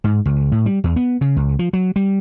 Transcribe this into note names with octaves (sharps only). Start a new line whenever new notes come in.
G#2
C#2
A2
G3
E2
B3
C#3
C#2
F3
F#3
G3